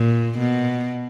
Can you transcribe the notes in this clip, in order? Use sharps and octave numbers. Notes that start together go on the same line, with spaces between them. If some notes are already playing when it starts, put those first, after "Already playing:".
Already playing: A#2
B2